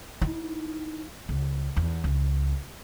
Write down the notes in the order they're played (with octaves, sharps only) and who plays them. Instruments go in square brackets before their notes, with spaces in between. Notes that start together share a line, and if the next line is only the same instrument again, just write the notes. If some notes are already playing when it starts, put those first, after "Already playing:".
[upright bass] D#4 E4
C#2
E2
C#2